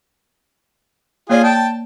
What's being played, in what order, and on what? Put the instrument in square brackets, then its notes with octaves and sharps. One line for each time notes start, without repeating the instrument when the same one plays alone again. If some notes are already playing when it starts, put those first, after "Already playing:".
[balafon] A#3 C#5 D5 [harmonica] F4 G#4
[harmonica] G5 A5